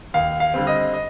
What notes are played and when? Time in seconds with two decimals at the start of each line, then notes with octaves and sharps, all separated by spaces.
0.14 D#2 F5
0.40 F5
0.54 D3 G3 C4
0.67 D#5
0.94 D#5